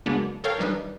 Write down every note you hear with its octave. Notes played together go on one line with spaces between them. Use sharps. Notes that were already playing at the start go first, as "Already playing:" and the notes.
C#3 F#3 G#3 A#3 B3 D4
A4 A#4 C#5 F5 G5
D#3 E3 G3 D4 D#4 B4